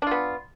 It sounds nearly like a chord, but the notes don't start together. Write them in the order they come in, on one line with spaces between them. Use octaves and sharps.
D4 F4 B3